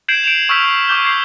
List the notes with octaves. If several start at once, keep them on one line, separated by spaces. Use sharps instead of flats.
G6 G#6 C7 D7 E7 F#7
D7 E7 F7
C#6 E6 F6 G6 B6 E7
C#6 D6 G6 G7
G#6 C7